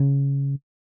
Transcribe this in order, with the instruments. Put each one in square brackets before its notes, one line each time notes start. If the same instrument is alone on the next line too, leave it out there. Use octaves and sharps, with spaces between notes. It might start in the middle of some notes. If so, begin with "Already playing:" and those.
Already playing: [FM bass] C#3